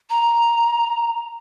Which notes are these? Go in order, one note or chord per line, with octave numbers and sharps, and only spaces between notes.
A#5